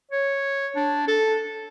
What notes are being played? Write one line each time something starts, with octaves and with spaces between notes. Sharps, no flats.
C#5
D4
A4